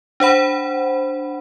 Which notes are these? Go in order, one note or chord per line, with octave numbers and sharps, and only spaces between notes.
D4 C5 F#5 B5